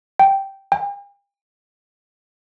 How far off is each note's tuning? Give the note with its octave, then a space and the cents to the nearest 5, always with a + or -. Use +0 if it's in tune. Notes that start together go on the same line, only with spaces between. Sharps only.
G5 -5
G5 +45